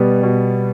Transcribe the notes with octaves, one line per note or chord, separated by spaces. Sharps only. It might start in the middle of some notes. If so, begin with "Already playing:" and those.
Already playing: B2 G3 B3
B2